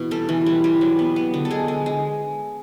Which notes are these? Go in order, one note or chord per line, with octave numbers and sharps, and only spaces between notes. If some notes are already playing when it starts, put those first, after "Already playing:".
Already playing: B2 E3
G3 A4
E3
G3
G3
F#3
B3
B3
D3
A4
G#3 G#4
G#3
G#3